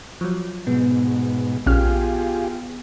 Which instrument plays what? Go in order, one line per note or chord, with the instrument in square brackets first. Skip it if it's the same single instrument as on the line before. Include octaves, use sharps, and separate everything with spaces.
[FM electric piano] F3 F#3
[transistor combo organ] G#2 B2 [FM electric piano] B3
[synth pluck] A#1 C#4 F6 [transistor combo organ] F4 G4 G#4